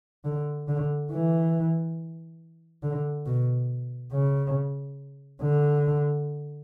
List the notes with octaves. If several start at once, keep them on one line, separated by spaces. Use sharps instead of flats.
D3
D3
E3
D3
B2
C#3
D3